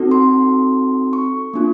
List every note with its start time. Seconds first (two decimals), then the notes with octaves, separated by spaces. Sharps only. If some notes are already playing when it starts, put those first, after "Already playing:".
Already playing: C4 D#4 F#4 A4
0.11 C6
1.13 C#6
1.54 A#3 D4 F4